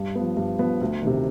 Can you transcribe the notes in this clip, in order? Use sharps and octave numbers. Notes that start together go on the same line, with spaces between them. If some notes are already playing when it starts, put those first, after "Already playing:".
Already playing: G2
F3 B3
G2
F3 B3
D2
C3 D#3